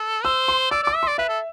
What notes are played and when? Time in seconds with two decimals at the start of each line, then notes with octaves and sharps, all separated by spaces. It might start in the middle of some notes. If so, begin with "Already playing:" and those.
Already playing: A4
0.24 C5 E6
0.48 C6
0.71 D5 E6
0.83 D5 D6
0.95 E5
1.03 C6
1.07 D5
1.18 B4 E5
1.29 A4